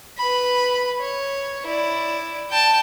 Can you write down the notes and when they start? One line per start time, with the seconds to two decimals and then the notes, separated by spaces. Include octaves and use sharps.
0.18 B4 B5
1.00 C#5
1.66 E4 D5
2.50 G5 A5